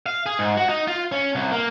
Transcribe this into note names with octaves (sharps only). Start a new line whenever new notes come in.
F5
G#4
G#2
F#4
D#4
F4
C#4
C2
A#3